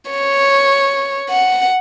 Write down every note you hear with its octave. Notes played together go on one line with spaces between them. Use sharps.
C#5
F#5